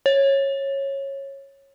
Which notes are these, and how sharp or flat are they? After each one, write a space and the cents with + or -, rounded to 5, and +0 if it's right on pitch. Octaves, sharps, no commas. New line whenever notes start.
C#5 -15